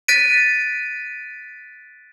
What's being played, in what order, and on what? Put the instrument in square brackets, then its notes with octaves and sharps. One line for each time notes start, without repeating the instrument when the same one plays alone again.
[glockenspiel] F#6 A6 B6 D7 D#7